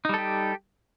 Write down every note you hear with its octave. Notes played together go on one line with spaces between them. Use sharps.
G3 D#4 G4 A4